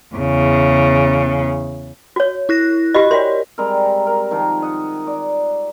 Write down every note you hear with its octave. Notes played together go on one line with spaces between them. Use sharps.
E2 C#3
F#4 C#5
E4 F#6 A#6
F#4 G4 D#5 B5
A#4 C#5 D5 C6
G3 G#3 C4 A#4
A#5
A#4
D#3 F3 A#4
D#5 F#5
D5